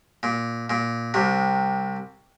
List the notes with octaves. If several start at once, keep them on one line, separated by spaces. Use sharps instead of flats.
A#2
A#2
C2 C3